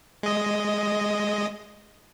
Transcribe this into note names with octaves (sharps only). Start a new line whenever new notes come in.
G#3 D#5